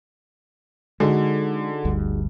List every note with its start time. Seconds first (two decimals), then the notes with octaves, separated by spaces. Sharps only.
1.00 D3 G#3 D#4 F#4 G#4
1.85 G1 D2 G2